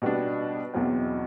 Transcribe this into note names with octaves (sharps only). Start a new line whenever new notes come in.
B2 G3 B3 D4
E2 B2 F#3 C4